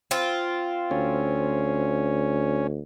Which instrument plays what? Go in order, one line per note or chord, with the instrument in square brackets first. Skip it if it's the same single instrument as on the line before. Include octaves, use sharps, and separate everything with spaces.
[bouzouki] C4 F4
[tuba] D2 [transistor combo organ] C#4